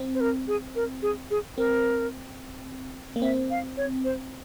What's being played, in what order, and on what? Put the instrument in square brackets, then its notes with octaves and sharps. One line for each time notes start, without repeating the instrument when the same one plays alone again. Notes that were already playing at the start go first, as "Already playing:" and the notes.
Already playing: [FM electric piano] C4
[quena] C5
A#4
G#4
A#4
G#4
G#4
[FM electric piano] C4 [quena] A#4
[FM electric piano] A#3
[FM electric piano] C4 [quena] E5
[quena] F5
C#5
C5